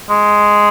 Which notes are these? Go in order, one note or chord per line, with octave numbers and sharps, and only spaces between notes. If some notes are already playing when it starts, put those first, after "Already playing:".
G#3